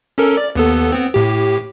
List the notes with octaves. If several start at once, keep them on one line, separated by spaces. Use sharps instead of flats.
C#4 A4 A#4
D5
D#2 B3 A4
B3 C4
A2 G4